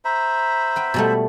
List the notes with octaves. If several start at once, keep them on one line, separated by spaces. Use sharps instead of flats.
C5 E5 A#5 B5
B4 G5
B2 G3 A3